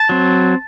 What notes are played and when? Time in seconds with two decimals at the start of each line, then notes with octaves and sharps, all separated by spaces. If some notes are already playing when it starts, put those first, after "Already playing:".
Already playing: A5
0.09 F#3 C4